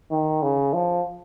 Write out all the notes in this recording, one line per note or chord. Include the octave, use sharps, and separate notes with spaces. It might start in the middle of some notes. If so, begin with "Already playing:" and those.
D#3
C#3
F3